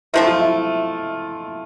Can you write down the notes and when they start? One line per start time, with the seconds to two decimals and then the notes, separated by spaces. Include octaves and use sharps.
0.14 C3 F3 A3 E4
0.27 F4
0.41 E4